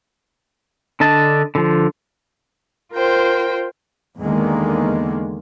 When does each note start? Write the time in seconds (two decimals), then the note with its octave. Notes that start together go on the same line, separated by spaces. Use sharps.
1.00 D3 D4 D#5 A5
1.55 D3 F3
2.93 F4 A#4 C5 G5
4.19 E2 D3 D#3 G#3 A#3